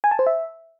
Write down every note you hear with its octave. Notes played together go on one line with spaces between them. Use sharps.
G#5
A5
C5
E5